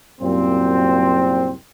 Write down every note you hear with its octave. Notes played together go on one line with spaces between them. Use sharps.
C2 F#2 A#2 C4